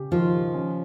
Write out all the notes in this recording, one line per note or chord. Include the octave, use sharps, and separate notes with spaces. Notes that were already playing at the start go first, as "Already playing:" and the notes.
Already playing: C#3 C#4 G4
D#3 F3 F4
G4
C#4